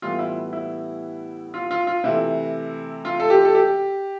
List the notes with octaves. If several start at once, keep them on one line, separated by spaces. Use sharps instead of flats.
A2 E3 G3 B3 F4
E4
E4
F4
F4
F4
C3 E3 A3 E4
F4
A4
G4
A4
G4